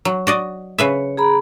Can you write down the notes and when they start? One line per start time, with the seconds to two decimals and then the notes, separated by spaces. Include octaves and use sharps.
0.05 F#3
0.27 F#4 D5 D#5
0.78 C#3 B4 C#5 E5
1.17 G#4 A#5 B5